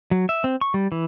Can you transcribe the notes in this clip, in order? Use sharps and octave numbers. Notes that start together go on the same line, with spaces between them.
F#3
E5
C4
C#6
G3
E3